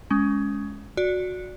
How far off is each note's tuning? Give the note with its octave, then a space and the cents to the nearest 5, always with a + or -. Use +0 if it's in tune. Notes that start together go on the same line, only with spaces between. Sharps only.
G#3 +5 C#4 +15
F#4 -15 D5 +0